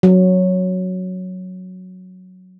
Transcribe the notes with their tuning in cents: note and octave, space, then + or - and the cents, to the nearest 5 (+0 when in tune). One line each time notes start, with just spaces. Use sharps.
F#3 -5